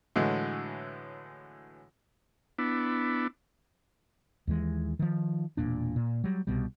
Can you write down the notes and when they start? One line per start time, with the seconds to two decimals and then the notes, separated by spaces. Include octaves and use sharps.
0.16 A2 D3 E3 F#3 G#3
2.59 B3 D4 E4
4.47 D#2 E3 G#3
4.99 D#3 F3
5.57 E1 B1 A#2 D4
5.96 A#2
6.24 F#3 G3
6.47 C2 B2 G3